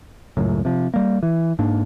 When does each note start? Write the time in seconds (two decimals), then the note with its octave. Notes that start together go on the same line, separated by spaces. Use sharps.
0.37 C#2 F#2 A2
0.65 C3 F3
0.94 G3 A#3
1.23 E3
1.59 G#2 A#3 D4